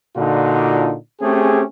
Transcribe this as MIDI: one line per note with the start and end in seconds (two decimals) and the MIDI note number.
0.16 0.95 46
0.16 0.95 50
0.16 0.95 62
0.16 0.95 63
0.16 0.95 65
0.16 0.95 66
1.21 1.62 57
1.21 1.62 60
1.21 1.62 61
1.21 1.62 67
1.21 1.62 68